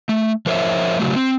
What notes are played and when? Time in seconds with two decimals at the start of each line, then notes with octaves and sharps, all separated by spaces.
0.09 A3
0.46 F3 A#4 C5 C#5 E5
0.99 C#3 F#3 A3
1.16 C4